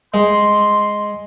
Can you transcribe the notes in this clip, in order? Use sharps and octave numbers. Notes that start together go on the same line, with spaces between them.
G#3 C6